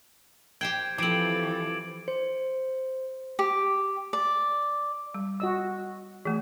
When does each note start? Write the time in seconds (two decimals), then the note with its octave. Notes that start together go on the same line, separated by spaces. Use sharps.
0.61 G4 C5 G5 G#6
0.98 E3 F3 C4 A4 D6 D7 F#7
2.08 C5
3.39 G4
4.13 D5
5.14 G3
5.40 F#4 D#5 E6
6.25 E3 A3 G#4